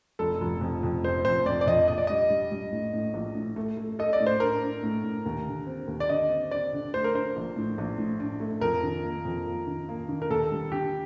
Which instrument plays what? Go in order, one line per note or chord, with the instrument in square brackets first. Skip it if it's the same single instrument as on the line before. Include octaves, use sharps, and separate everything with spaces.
[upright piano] F1 [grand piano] A4
[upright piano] F1
F2
F2
[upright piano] F1 [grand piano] C5
[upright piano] F2 [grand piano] C5
[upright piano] F2 [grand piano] D5
[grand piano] D5
[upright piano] F2 [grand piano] D#5
[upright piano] A#1 [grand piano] D#5
[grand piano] D5
[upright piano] G3 [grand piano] D#5
[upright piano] G3
G3
A2
A2
A#1
A2
A3
A3
[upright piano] A4 [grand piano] D#5
[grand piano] D5
[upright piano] A2
[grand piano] C5
[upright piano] D4 [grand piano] A#4
[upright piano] D4
A2
A2
D#2
D3
C4
D#2
[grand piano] D5
[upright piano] D3 [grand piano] D#5
[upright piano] C4
[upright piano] C4 [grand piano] D5
[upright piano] D3
[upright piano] A3 [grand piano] C5
[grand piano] A#4
[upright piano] D4 [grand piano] C5
[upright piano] A#1
A2
A#1
A2
D4
A3
[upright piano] F2 [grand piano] A#4
[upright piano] D#3
A#3
F2
A#3
D#3
A#3
D#3
[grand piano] A#4
[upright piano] D#2 [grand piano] A4
[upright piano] G3
[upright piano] D3 [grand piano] G4